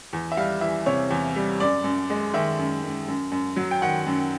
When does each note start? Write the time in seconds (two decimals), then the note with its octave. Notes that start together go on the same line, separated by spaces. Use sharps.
0.13 E2
0.32 E5
0.37 G3 F5
0.61 E3 E5
0.86 C3 C#5
1.11 E2
1.36 G3
1.60 F#2 D5
1.84 F#2
2.10 G#3
2.34 D#3 E5
2.59 F#2
2.84 F#2
3.08 F#2
3.32 F#2
3.56 F#3
3.71 G5
3.82 D#3 F#5
4.06 F#2